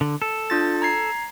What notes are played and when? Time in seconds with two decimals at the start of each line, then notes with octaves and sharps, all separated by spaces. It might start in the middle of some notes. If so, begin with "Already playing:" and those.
0.01 D3
0.22 A4
0.50 D4 F4 A6
0.82 A#5 G#6 C7